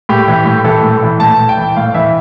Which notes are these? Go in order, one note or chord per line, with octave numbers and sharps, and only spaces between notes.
A2 G4
E3
A2
E3 A4
A2
E3
A2 A5
A2
G5
E3
A2 F5
E3 E5